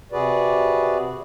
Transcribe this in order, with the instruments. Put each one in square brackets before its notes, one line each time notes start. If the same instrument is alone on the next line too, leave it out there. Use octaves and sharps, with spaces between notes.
[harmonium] C3 F#4 G#4 B4 D5